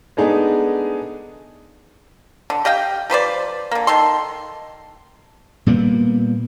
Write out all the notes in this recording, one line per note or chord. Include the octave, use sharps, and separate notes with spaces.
G#3 A3 B3 D4 D#4 G#4
D3
G4 D#5 F5 G5
F3 B4 C5 D5
D3 A#3
D#3 A4 C6
A#2 G3 A#3 B3